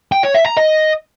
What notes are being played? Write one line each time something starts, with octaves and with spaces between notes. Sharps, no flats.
G5
C#5
E5
A#5
D#5